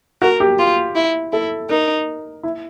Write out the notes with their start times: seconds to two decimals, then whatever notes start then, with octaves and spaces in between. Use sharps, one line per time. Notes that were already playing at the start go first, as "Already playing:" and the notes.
0.22 F#4 A#4
0.40 G4
0.59 F4
0.95 E4
1.33 E4 A4
1.69 D#4 A#4
2.43 E4